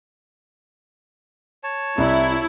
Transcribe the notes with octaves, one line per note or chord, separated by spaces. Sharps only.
C#5 A5
C2 E4